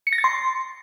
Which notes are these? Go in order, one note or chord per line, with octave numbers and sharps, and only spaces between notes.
C#7
A#6
A6
C6